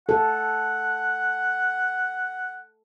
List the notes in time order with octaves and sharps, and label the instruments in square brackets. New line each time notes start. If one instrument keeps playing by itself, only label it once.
[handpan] A4 [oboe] F#5